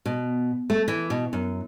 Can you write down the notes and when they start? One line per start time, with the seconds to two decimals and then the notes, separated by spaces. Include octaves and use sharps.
0.06 B2
0.70 A3
0.88 E3
1.10 B2
1.33 F#2